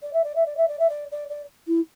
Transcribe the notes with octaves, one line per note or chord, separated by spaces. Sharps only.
D5
E5
D5
E5
D5
E5
D5
E5
D5
D5
D5
E4